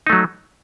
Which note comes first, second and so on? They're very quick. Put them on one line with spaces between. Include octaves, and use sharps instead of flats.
D#4 A3 F#3